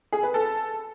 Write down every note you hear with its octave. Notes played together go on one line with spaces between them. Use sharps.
G#4
B4
A4